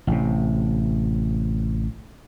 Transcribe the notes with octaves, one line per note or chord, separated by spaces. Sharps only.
A1 C3